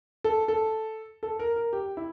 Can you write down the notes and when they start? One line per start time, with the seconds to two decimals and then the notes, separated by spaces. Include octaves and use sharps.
0.24 A4
0.48 A4
1.23 A4
1.39 A#4
1.56 A#4
1.73 G4
1.97 E4